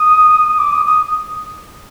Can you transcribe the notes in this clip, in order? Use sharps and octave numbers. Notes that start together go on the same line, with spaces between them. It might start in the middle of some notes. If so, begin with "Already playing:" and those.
Already playing: D#6
D6
D#6
D#6